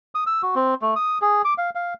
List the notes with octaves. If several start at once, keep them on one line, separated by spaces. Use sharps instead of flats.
D#6
E6
F#4
C4
A3
D#6
G#4
D6
F5
F5